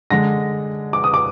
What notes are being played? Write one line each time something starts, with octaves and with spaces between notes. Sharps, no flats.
D3 G#3 A#6
D6
D#6
D6